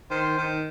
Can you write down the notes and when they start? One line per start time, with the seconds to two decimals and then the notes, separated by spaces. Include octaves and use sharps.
0.11 D#3 C5
0.38 D#3